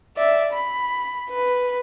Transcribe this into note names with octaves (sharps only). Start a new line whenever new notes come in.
D5 E5
B5
B4